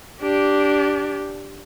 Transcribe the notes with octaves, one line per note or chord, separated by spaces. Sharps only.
D4 G4